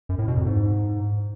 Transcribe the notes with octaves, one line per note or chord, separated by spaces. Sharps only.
F#2
A2
B2
F2
G#2